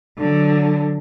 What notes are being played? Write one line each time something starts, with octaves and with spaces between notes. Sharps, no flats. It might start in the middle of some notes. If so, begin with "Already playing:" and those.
D3 F#3